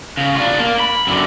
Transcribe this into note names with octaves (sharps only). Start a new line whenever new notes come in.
C#3
D4 F4
A#3
B5
F#2 D3